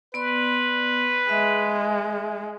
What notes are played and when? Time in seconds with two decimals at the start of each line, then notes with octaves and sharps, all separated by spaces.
0.14 B3 B4 D5 C6
1.29 G#3 E5